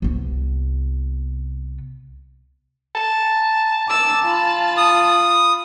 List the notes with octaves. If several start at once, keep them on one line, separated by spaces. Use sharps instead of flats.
C2 B3
A5
A5 D6 E6 A6
F4 B5
D#6